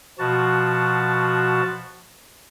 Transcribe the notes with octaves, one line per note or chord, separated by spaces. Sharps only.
B2 F3 F#4 A5